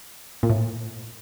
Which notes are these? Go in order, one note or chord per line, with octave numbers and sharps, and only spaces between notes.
A#2
A2